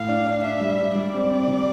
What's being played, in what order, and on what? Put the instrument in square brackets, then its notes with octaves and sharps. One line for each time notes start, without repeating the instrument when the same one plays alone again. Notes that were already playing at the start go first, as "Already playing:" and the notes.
Already playing: [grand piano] A2 [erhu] F5
[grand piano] D4
D4
[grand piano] D4 [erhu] E5
[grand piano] G3
D4
[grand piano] G3 [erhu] D5
[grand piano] C4
C4
C3